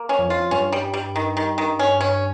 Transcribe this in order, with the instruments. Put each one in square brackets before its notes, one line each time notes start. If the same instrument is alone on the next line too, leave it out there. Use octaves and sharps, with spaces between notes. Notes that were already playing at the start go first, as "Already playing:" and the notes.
Already playing: [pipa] A#3
C#4
[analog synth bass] F2
[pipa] F4
[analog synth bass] G2 [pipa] C#4
[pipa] G3
G3
D#3
D#3
D#3
C#4
C#4